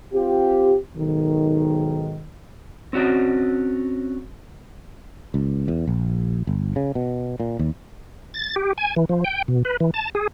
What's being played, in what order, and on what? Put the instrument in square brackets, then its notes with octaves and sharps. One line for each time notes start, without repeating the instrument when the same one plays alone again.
[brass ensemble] C4 F4 G4
B1 G#2 D#3
[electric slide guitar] C4 C#4 F#4 D5 D#5
[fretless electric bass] C#2
E2
A#1
G1
C#3
B2
A#2
D#2
[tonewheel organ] A6
G4
G#5
E3
F3
G5
B2
B4
E3
A5
G#4